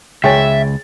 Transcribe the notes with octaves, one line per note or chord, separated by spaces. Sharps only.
C#2 G#4 C#5 E5 G5 G#5 A6